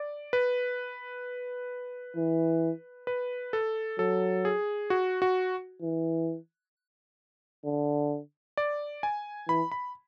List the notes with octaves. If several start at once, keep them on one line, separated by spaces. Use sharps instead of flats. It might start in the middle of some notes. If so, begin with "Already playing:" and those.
Already playing: D5
B4
E3
B4
A4
F#3 A4
G#4
F#4
F#4
E3
D3
D5
G#5
E3 B5
B5